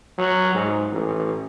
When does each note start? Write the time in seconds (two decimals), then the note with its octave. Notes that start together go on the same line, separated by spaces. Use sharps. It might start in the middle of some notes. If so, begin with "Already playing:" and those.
0.18 F#3
0.55 G#2
0.92 A1